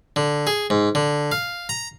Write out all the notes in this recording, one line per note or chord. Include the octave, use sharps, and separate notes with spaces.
D3
G#4
G#2
D3
F5
A#5